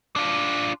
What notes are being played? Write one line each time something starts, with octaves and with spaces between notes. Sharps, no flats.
D4 F4